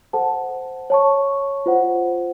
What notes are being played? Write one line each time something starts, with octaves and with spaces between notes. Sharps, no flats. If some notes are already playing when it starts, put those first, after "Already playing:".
A4 C5 F#5 A5
C#5 A5 C#6
F4 C5 F#5